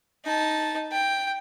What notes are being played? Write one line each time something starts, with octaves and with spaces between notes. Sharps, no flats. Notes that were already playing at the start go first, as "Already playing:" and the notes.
D#4 A5
G5